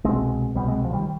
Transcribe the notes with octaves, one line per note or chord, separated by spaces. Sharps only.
C2 B2 G#3 C4
C2 B2 G3 B3
G#3 C4
F3
D#3 G3